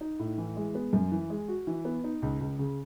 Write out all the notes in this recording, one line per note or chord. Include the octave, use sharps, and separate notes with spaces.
D#4
A2
E3
G#3
B3
F#2
E3
G#3
F#4
E3
B3
D#4
C#2
C#2
C#3